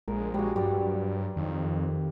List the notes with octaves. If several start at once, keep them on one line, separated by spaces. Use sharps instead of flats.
A#1 G#3 A#4
G3 G#3 F#4
G2 F#3 G3 D5
F2 D#3